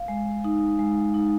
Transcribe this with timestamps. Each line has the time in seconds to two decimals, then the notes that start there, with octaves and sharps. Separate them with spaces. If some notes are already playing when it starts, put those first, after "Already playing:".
Already playing: F5
0.08 G#3
0.44 D#4
0.79 G#3
1.14 D#4